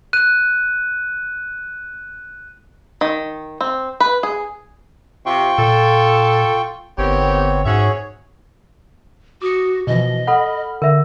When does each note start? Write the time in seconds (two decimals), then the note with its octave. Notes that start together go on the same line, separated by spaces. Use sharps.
0.13 F#6 D#7
3.01 D#3
3.61 C4
4.00 B4
4.23 G#4
5.26 C3 F4 G5 C#6
5.58 A#2 A4
6.98 G1 D#3 B3 C4 G4 C#5
7.66 G#2 C#4 F#4 G#4 C#5 E5
9.42 F#4 D6 D#6 C#7
9.87 B2 E3 F3 D#5
10.27 A4 F#5 B5 F6
10.82 D3 A#4 E5